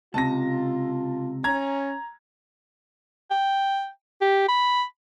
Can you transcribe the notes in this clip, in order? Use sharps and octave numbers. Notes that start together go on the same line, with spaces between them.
C#2 C3 F4 A5 A#6
C#4 A#5 G#6
G5
G4
B5